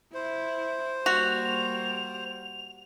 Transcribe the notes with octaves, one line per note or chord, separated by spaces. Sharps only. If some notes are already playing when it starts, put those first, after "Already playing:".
E4 C5
G3 A#3 F#4 F7